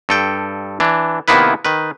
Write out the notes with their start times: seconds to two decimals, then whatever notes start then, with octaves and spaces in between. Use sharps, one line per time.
0.09 G2 A4 G5
0.80 E3 D4
1.28 C3 D#3 A#3 B3 E4 B4
1.65 D#3 B4